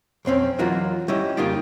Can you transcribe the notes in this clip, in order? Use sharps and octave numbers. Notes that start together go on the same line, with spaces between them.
B1 F2 C4 C#4
E3 F#3 F4 F#4 A#4 D#5
G3 C#4 E4 D#5
F2 C#3 A#3 D#4 F4 G4